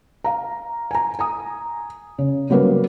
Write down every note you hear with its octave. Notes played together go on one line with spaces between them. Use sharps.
F5 A#5
G#5 A#5
G#5 A#5 D#6
C#3
C#3 F#3 G3 A#3 B4